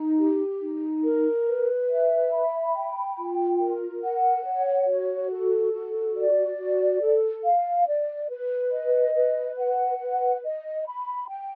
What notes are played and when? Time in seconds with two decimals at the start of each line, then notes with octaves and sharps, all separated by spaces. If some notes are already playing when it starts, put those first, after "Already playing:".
Already playing: D#4
0.18 G4
0.60 D#4
1.03 A#4
1.47 B4
1.90 E5
2.31 B5
2.75 G5
3.18 F4
3.60 A#4
4.02 F#5
4.45 C#5
4.87 F#4
5.30 A4
5.73 F#4
6.16 D5
6.58 F#4
7.01 A4
7.44 F5
7.87 D5
8.30 B4
8.71 D#5
9.15 B4
9.58 F#5
10.00 B4
10.43 D#5
10.86 B5
11.28 G5